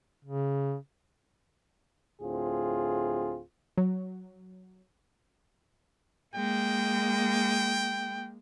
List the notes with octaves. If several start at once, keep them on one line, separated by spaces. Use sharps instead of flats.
C#3
D2 A2 C4 F4 G#4
F#3
G#3 A#3 G5